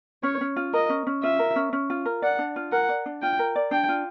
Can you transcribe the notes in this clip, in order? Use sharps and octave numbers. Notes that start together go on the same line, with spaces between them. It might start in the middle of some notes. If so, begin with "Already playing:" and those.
C#4 C#5
C#4
F4
A#4 D#5
C#4
C#4
F4 E5
A#4
C#4
C#4
F4
A#4
D5 F#5
D4
F4
A#4 F#5
D5
D4
F4 G5
A#4
D5
D4 G5
F4